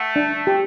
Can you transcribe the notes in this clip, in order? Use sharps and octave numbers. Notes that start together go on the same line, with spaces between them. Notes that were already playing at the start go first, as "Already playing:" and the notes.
Already playing: A3 F#5
D4
G4